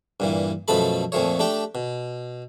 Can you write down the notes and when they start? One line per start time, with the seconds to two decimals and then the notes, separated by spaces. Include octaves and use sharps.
0.20 G2 A#2 E3
0.68 F#2 B2 F3 A3 A4 B5
1.12 F2 A#2 F3 A3 C#5
1.39 A3 D4 G4 G5
1.75 B2